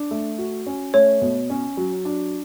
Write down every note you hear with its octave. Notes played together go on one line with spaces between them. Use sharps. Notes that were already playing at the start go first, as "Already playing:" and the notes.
Already playing: D4
A3
F#4
C#4
A3 C#5
B2
C#4
F#3
D4